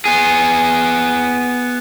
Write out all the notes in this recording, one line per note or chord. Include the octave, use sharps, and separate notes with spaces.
B3 G#4